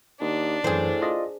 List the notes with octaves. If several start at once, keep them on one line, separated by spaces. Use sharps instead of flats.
D#2 D4
F#2 A2 E3 G#4 C5
F4 D5 D#5